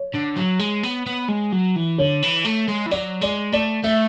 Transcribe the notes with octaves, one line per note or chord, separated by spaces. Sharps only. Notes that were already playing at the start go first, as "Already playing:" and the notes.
Already playing: C#5
D3
F#3
G#3
B3
B3
G#3
F#3
E3
D3 C#5
E3
A3
G#3
E3
F#3 D5
G#3 D5
A3 D5
A3 E5